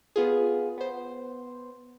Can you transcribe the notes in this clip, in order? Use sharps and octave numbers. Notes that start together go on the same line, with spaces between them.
B3 F4 G#4
B3 C5